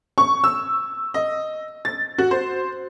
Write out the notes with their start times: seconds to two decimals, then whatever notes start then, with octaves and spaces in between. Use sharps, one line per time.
0.18 C#6
0.44 E6
1.14 D#5
1.85 A6
2.18 F#4
2.31 C5